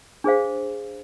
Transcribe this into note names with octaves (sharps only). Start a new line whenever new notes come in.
D4 G#4 C5 F5